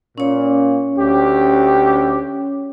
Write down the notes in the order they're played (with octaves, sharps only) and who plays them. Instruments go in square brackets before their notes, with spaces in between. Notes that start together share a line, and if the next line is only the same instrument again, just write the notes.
[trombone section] A#2 [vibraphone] C#4 C#5
[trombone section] D2 G4